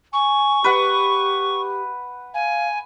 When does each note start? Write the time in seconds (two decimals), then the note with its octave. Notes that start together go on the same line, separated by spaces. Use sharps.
0.13 G#5 C#6
0.64 G4 B4 F#5
2.34 F5 G#5